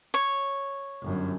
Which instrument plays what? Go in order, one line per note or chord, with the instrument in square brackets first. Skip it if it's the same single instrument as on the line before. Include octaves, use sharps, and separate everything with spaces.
[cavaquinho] C#5
[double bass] G1 F#2